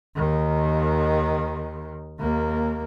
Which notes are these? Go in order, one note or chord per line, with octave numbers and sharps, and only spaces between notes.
D#2 D#3
D#2 A#3